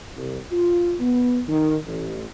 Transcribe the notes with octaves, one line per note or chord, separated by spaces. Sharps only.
C2
F4
B3
D#3
A1